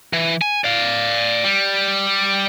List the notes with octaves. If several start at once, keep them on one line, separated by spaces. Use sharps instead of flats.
E3
G#5
D5 F5
G3